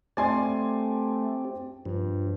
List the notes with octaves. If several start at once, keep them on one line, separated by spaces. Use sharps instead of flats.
A3 C4 G4 D5 G#5 C6
G2 F3